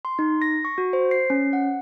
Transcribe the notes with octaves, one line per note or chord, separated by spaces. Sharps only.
C6
D#4
A#6
C#6
F#4
C5
C7
C#4
F#5